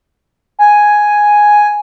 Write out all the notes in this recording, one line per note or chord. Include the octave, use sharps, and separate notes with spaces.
G#5